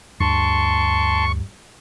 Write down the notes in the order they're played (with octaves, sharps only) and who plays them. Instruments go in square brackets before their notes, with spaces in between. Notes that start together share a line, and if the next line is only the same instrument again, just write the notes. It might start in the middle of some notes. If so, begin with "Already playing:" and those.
[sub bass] D2 [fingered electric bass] G2 [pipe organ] A5 C6 [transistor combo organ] C#6